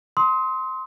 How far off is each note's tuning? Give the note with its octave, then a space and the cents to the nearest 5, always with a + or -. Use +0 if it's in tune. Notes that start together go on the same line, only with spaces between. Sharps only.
C6 +0 D#6 +40